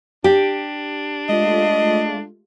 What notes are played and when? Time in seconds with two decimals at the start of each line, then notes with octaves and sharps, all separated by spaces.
0.24 D4 G4
1.29 G#3 A3 F4 D#5